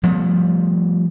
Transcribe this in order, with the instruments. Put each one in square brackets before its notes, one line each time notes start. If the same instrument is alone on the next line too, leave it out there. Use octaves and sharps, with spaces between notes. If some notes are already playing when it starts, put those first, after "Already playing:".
[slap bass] F3 G3 A3 B3